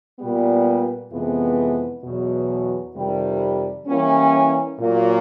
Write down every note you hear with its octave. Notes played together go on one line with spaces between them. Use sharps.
A#2 G3 B3
F2 C3 E3 G#3 B3
E2 B2 F#3
F2 C3 D#3 G3
E3 G3 A#3 C#4
A#2 F#3 A#3